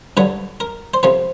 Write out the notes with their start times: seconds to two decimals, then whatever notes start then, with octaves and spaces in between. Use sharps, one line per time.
0.17 G2 D3 F#3 B4
0.60 A#4
0.94 C5
1.03 F2 C3 F3 B4